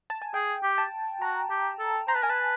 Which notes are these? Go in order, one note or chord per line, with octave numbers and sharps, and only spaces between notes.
A5
G#5
G#4 G5
G4
A5
F#4 A#5
G4
A4
C5 A#5
B4 A5
A#4 G#5
B4 A5